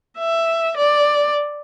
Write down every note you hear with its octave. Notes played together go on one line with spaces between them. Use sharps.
E5
D5